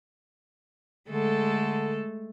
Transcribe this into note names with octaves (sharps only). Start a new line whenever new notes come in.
D3 G#3 A3 A4